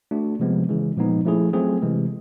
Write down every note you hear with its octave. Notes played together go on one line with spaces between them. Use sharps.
A3 D4 F#4
C3 F3 G#3 B3
C#3 E3 G#3
A#2 F3 G#3 B3 D#4
F3 A3 C#4 E4 G#4
F#3 A3 C4 F4 G#4
C3 E3 G#3